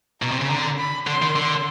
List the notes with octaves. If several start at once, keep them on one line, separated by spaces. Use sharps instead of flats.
B2 A#5
C3
C#3
D3
B5
D3 C6
D#3
D3